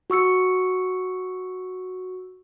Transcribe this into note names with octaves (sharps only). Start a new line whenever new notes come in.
F#4 C#6 E6 C#7